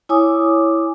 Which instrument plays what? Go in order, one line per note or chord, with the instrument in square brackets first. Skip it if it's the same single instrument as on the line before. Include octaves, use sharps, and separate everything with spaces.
[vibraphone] E4 C#5 G#5 D6 D#6